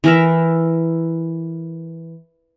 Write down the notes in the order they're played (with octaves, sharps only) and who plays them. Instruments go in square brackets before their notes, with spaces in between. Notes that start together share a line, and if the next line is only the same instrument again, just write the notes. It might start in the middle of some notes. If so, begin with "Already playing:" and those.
[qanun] E3 A#4 E5